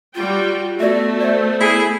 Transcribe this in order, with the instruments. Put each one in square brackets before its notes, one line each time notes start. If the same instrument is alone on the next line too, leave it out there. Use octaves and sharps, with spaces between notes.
[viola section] G3 F#4 G5 [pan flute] F4
[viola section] A3 B3 [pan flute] F#4 [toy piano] D5 E5
[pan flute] C5 [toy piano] D5 E5
[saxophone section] E4 G#4